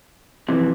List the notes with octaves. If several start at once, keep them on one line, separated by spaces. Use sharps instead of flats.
F2 C3 E3